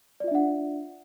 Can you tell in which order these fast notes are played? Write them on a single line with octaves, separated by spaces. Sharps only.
D5 F4 E5 D4 F#5